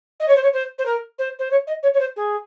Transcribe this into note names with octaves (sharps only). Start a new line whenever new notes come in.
D#5
C#5
C5
C#5
C5
C5
A#4
C5
C5
C#5
D#5
C#5
C#5
C5
G#4